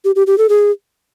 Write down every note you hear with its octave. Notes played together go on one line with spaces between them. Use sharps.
G4
G4
G4
A4
G#4